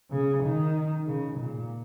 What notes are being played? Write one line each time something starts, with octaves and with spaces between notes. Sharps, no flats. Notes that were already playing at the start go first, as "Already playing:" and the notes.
C#3
D#3
C#3
A#2